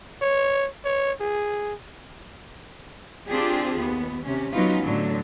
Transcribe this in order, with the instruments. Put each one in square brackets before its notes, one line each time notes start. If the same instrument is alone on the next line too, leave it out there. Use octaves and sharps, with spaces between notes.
[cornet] C#5
C#5
G#4
[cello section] C4 D4 F4 G4 G#4
D#2 B3
C3 C#4
F#3 B3 C#4 D#4 F4 F#4
A2 D3 F#3